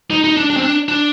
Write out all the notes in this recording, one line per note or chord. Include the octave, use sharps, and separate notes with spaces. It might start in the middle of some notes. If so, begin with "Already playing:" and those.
D#4
D#4
D4
D4
C4
D4
D4